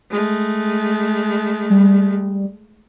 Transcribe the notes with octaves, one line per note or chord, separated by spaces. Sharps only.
G#3 A3
G3